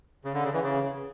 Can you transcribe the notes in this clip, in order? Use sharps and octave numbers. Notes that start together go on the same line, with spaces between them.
C#3
D3
C#3
E3
C#3